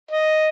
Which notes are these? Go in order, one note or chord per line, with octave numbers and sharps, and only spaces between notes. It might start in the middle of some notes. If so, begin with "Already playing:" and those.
D#5